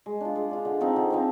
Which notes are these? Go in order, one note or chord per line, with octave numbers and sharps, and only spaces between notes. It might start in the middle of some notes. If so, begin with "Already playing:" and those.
G#3
D4 F4
G#3
D4 F4
D3
F3 C4 D#4
D3
F3 C4 D#4